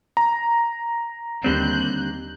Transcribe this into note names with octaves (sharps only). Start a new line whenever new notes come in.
A#5
D#2 D3 G3 C4 F#6 G6